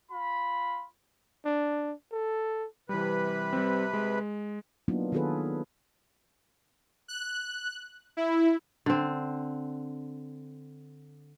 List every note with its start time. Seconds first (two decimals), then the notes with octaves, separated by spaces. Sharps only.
0.11 F4 B5
1.45 D4
2.12 A4
2.89 C3 E3 G3 B4
3.53 G3 C4
3.93 G#3
4.88 F#3 A#3 B3 D4 D#4 F4
5.12 D#3 B3 F4 G#4 A4 B4
7.08 F#6
8.17 E4
8.86 D3 C4